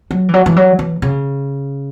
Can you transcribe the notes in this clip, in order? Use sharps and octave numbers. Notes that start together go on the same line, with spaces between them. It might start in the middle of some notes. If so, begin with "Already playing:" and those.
F#3
E3
F#3
E3
F#3
E3
C#3